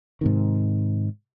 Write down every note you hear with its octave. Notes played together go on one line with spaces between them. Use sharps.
G#2 C3 D#3